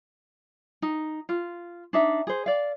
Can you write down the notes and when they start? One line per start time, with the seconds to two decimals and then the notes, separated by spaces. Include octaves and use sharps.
0.82 D#4
1.29 F4
1.93 D4 D#4 E5
2.27 G#4 C5
2.46 D5 F5